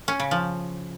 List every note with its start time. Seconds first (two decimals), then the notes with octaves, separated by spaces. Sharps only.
0.08 C#4
0.20 C#3
0.31 F3